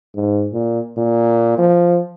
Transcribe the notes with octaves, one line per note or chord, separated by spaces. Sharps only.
G#2
A#2
A#2
F3